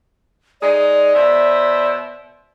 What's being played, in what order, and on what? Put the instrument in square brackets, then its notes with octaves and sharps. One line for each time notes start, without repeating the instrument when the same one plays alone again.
[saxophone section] G#3 D#4 G#4 [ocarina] D5
[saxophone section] B2 C5 E5